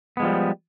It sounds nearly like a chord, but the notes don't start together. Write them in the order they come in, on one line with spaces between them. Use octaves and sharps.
B3 G#3 F3 G3